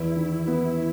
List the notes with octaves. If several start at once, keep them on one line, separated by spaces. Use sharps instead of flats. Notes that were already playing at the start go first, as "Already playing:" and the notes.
Already playing: E2 E4
D#3
B3